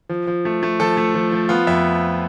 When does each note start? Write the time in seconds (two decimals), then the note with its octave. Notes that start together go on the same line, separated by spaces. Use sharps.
0.09 F3
0.27 F3
0.45 A3
0.63 A3
0.80 F3 A4
0.97 A3
1.15 F3
1.32 F3
1.49 B3 F4
1.67 F2 E5